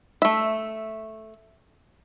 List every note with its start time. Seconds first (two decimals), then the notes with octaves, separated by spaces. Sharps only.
0.22 A3 E5